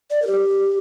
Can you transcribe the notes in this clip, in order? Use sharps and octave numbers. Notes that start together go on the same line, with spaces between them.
D5
A#4
G4